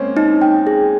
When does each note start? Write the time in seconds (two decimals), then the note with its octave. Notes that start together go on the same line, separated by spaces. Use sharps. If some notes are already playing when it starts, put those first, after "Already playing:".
Already playing: G#3 A#3 C4 C#4
0.17 D#4
0.41 G5
0.67 G#4